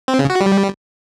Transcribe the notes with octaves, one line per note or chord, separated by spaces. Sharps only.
C4
C#3
F#4
G3